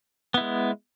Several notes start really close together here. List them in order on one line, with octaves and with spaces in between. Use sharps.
B3 E4 G#3